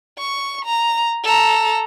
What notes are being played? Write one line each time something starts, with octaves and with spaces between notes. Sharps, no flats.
C#6
A#5
A4 A#5